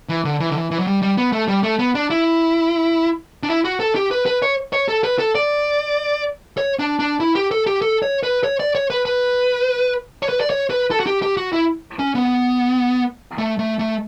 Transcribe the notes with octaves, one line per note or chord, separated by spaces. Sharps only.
E3
D3
E3
D3
E3
E3
F#3
G3
G3
B3
A3
G3
A3
B3
D4
E4
D4
E4
F#4
A4
G4
B4
B4
C#5
C#5
A4
B4
A4
D5
C#5
D4
D4
E4
G4
A4
G4
A4
C#5
B4
C#5
D5
C#5
B4
B4
C#5
B4
D5
C#5
B4
A4
F#4
G4
G4
F#4
E4
C#4
B3
A3
A3
A3